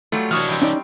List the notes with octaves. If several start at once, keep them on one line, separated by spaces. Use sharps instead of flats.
F#3 G3 A3 F4
E3 D4 F#4 C#5 C#6 D#6 F6
G3 C4
C#4 D#4 D5